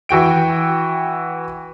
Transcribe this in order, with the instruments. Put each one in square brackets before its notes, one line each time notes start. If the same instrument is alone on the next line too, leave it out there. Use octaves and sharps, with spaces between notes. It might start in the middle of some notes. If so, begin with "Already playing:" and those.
[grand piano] E3 F#4 G5 D7